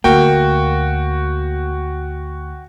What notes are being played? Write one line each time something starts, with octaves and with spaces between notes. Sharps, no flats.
D2 A#3 F#4 G5